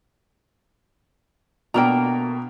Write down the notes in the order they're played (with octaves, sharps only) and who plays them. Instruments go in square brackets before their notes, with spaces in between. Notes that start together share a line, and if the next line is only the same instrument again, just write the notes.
[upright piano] B2 [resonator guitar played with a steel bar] A3 A#3 A#5 [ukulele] D4 G5